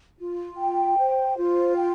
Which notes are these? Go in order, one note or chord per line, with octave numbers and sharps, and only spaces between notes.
F4
G5
C5
F4
G5